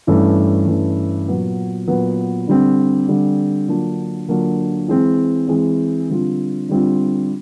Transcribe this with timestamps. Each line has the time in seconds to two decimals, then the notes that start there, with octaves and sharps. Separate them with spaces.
0.07 G2 E3 A3 C#4
0.67 G2 E3 A3 C#4
1.28 A#2 F#3 B3
1.87 A#2 F#3 B3
2.47 D3 G3 C4
3.08 D3 G3 C4
3.68 D3 F#3 A#3 D4 F4
4.28 D3 F#3 A#3 D4 F4
4.88 E3 G#3 C4
5.48 E3 G#3 C4
6.09 D3 G3 C4 F4
6.69 D3 G3 C4 F4